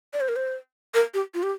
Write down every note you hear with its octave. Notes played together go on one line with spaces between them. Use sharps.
D5
C5
A#4
C5
A#4
G4
F4
G4